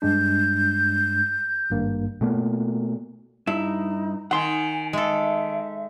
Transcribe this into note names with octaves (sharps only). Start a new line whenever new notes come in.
G2 G#3 D4 G6
G#1 G2 A#3
B2 A3 A#3
G2 D#4 E4
D#3 F#5 G#5 C6
G#3 A4 E5